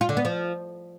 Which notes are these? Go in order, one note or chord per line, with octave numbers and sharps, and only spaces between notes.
F4
D3
B3
F3